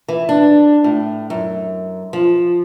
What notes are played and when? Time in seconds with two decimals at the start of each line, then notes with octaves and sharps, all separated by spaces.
0.08 E3
0.29 D4
0.84 A2
1.30 F#2
2.13 F3